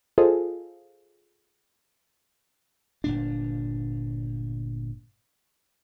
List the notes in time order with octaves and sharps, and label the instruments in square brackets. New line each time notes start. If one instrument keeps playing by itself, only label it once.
[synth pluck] F4 G#4 A4 C5 D#5 F5
[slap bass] G1 A#2 D4